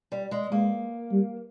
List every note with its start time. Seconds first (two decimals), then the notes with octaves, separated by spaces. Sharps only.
0.12 G3
0.31 G#3
0.51 G#3 A#3
1.12 G3